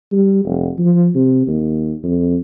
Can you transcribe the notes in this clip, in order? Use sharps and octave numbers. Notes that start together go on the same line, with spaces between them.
G3
F1
F3
C3
D#2
F2